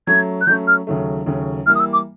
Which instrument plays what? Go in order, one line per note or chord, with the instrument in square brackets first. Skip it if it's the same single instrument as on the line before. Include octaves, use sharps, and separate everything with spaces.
[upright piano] F#3 A3 C#4 [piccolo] G#6
[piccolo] F#6
[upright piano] F#3 A3 C#4 [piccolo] G6
[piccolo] F6
[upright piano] D#2 C#3 F#3 A3
D#2 C#3 F#3 A3
[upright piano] E3 G3 A#3 [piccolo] F6
[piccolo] D#6
E6
D6